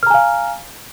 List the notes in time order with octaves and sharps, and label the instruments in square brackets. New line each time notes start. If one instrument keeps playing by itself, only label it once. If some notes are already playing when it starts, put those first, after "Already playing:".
[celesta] F6
A#5
G#5
F5